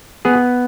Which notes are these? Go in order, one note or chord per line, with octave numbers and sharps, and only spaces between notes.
B3 G#4